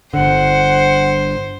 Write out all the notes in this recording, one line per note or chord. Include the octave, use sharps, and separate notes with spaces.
G1 D3 C5 F#5